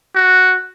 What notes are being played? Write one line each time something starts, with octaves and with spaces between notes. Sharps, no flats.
F#4